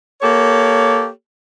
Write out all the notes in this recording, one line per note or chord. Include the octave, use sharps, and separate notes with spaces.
A#3 G4 A4 C#5